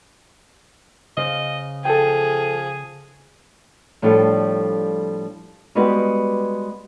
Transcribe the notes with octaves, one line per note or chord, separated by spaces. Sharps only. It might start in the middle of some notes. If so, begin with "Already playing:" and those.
C#3 C5 D#5 F5
F3 G#4 A4 G5
A2 F3 G3 D4 F4 A4
G3 G#3 B3 F#4 G4 B4